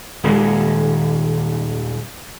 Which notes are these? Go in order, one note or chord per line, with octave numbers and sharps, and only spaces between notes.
D#1 D#2 G#3